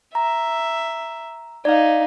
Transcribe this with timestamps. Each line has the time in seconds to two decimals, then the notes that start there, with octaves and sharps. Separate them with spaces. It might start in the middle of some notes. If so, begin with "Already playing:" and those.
0.15 E5 A#5
1.65 D#4 D5 F5